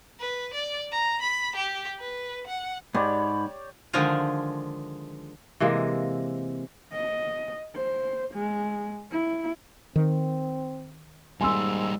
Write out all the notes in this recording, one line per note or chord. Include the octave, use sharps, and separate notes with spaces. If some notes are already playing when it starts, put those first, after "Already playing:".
B4
D5
A#5
B5
G4
B4
F#5
G#2 G4 C#5 D5 B5
D3 D#3 F3 G#3 F4 G#4
C3 E3 G#3 A#3
D#5
C5
G#3
E4
D#3 C4
G#2 G3 A#3 G#5 C6 E6